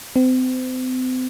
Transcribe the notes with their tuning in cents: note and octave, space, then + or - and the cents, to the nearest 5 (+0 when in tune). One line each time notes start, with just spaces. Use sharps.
C4 -35